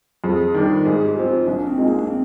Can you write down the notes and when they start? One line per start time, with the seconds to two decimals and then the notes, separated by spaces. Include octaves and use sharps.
0.24 F2 G#4
0.54 D#3 G3 D4 A#4
0.85 G#2 G#4
1.05 G4
1.16 F3 C4
1.26 F4
1.46 A#1 D4
1.67 C4
1.77 A#2 G#3 D#4
1.88 A#3
1.99 D4
2.07 C4